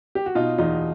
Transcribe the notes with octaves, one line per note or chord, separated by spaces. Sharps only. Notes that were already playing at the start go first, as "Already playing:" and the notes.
G4
F#4
B2 D#4 F4
E2 D#4 F4